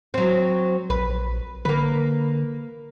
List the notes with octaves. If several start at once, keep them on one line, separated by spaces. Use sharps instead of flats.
F#3 C4
A#1 B4
D3 A#3 B4